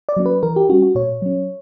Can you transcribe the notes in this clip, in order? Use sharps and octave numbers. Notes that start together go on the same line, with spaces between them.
D5
F#3 A#3 C#4
B4
E3 A#4
G4
G3 C#4 F#4
F#4
A#2 C#5
F#3 C#4